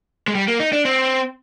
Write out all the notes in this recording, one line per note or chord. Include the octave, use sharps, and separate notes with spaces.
G#3
G3
A#3
D#4
D4
C4